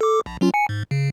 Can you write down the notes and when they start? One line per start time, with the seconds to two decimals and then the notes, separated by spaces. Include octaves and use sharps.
0.01 A4 D6
0.26 A#1
0.41 F#3 C#4 F4
0.54 G#5 C#7
0.69 G#2
0.91 C#3